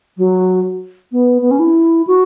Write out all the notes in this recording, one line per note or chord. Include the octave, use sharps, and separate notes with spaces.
F#3
B3
B3
C#4
E4
F#4